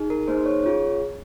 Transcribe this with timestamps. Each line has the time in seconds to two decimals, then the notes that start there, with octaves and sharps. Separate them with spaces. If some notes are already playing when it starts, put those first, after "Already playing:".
Already playing: D#4 G#4
0.10 A#4
0.28 A#3 D#4 G#4 C5
0.45 C#5
0.63 C#4 F4 G#4 C#5